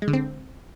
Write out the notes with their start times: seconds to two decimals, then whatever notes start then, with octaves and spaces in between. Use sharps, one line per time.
0.02 G#3
0.08 D3
0.13 C4